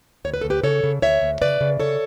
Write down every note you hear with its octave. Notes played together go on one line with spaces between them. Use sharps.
D2 C#5
B4
D2 A4
G4 B4
C#3 A4 C#5
C#3
D2 C#5 E5
D2
C#3 B4 D5
C#3
C#3 A4 C#5